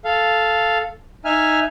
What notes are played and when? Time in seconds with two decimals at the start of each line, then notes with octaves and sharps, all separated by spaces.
0.05 A4 F5
1.25 D#4 E5 G#5 F6